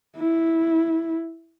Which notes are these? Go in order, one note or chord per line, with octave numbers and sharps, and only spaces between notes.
E4